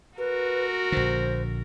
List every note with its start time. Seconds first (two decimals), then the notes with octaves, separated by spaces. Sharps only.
0.18 F#4 A#4 B4
0.92 A#1 D3 C5